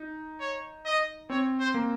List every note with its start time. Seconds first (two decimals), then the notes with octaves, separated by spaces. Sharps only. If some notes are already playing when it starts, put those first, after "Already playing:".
Already playing: D#4
0.40 C#5
0.85 D#5
1.30 C4 C#5
1.60 C5
1.74 A#3